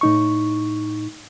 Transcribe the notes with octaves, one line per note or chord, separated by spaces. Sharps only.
A2 D#4 C#6